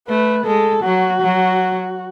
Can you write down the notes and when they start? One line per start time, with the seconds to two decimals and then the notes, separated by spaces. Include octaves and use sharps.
0.09 A3 B4
0.46 G#3 A4
0.84 F#3 F#4
1.22 F#3